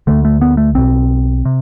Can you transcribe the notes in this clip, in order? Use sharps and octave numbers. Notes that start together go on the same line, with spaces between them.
D2 D3 A3
A3
B3
A3
B1 B2 C4
C3